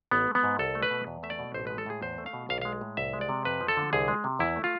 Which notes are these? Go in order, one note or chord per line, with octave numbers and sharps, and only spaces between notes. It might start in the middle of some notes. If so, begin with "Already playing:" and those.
A1 B3
G#3
B3
G#2
C2 A4
A3
B4
B2
E2
A3 E5
D5
B2
A1 C5
G#3 B4
A4
A2 G#4
E2 C5
A3
F5
B2
B1 F5
G#3 F5
A2
C2 E5
G#3
D5
C3
F2 B4
F3
A4
D3
C2 G#4
G#3
C3
E2 E4
A3
F4